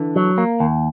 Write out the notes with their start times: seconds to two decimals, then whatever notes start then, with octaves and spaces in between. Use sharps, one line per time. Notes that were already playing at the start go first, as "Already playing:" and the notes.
Already playing: D3 E3
0.16 F#3
0.38 A#3
0.60 D#2